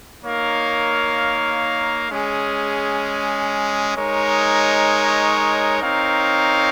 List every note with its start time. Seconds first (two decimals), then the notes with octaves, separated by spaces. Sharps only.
0.23 A#3 D#4 A#4 C#5 F5
2.09 G#3 C#4 G#4
3.95 G#3 D#4 A#4 C#5
5.81 C4 D#4 A#4 C#5 F5